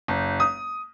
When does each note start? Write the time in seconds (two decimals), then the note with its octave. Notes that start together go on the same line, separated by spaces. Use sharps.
0.08 F#1
0.40 D#6